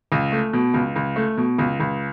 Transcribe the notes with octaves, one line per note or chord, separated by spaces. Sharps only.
C#2
A3
B2
C#2
C#2
A3
B2
C#2
C#2